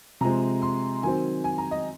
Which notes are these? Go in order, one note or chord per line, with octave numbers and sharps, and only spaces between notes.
C3 F3 G#3 C4 A#5
C6
D#3 F#3 C4 G#5
G#5
A#5
D#5